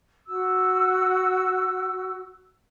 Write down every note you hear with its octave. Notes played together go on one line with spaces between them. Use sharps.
F#4 E6